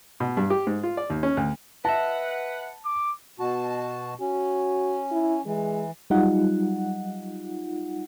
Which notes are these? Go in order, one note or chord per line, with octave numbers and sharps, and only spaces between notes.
B2
G2
G4
G#2
F4
D5
D#2
C#4
D2
B4 D#5 E5 F#5 A5
D6
B2 F#4 A5
C#4 F#4
E4
E3 G#3
F#3 G3 D#4 F4 F#5